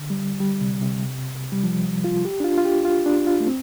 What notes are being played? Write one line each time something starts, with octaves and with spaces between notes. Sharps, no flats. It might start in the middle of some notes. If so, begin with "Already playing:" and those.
Already playing: D3
G3
G3
C3
C3
G3
F3
F4
G4
D4
F4
F4
G4
F4
D4
F4
A3
C4